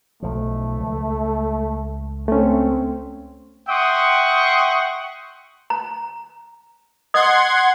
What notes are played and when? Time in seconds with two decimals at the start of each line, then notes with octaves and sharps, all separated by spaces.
0.22 B1 F3 A3
0.80 C#2
2.28 A3 C4 C#4
3.69 E5 F#5 G5 C6 C#6 D#6
5.70 A#5
7.14 D#5 F#5 C6 D#6 G#6